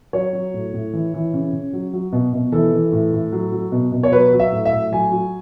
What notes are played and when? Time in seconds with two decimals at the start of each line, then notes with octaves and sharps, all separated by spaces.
0.13 F#3 C#5
0.33 F#3
0.54 A2
0.73 A2
0.93 E3
1.14 E3
1.34 C#3
1.53 C#3
1.73 F#3
1.93 F#3
2.12 B2
2.33 B2
2.52 E3 A4
2.72 E3
2.92 A2
3.13 A2
3.32 F#3
3.52 F#3
3.72 B2
3.92 B2
4.03 C#5
4.12 F#3 B4
4.33 F#3
4.40 E5
4.52 A2
4.65 E5
4.73 A2
4.92 F#3 G#5
5.11 F#3